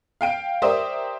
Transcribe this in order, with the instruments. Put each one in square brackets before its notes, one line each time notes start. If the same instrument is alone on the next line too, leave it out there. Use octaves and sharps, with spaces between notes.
[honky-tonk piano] F5 G5 D7
G4 A#4 C5 D5 E5 D#6